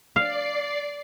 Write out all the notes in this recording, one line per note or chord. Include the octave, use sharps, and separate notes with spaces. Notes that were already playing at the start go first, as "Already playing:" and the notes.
D5 F5 C7